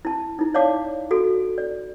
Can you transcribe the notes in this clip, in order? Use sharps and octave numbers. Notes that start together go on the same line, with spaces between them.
E4 A5
D#4 E4
C#5 D5 F5 A5 D6
F#4 A4
D5